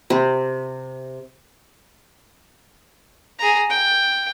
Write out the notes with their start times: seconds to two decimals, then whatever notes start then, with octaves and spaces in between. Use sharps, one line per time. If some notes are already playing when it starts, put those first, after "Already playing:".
0.10 C3
3.39 G#4 A#5
3.70 G5